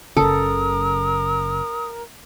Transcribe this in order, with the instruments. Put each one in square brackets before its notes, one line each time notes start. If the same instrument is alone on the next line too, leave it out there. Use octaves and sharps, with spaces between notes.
[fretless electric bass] F#1 C#3 [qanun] A4 [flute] A#4 [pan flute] D#6